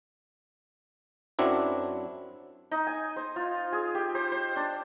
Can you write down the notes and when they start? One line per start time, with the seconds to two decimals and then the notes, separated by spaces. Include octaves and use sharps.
1.39 F#2 F#3 C4 D4 E4
2.71 D#4
2.87 G#5
3.16 C5
3.36 F4
3.73 G#4
3.95 G4
4.15 C5
4.32 C5
4.56 D4